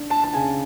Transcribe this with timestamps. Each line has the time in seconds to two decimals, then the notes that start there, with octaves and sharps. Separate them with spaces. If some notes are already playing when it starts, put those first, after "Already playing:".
Already playing: D4
0.10 A5
0.23 A5
0.34 C#3 G#5